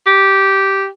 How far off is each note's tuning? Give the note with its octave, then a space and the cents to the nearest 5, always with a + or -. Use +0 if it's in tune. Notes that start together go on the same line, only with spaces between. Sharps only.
G4 -10